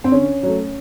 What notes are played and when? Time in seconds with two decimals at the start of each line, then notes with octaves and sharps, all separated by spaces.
0.04 C4
0.12 D3 C#4
0.43 F#3 A3